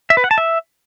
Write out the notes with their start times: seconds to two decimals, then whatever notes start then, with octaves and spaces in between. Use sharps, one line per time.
0.10 E5
0.17 B4
0.24 F#5
0.31 A5
0.38 E5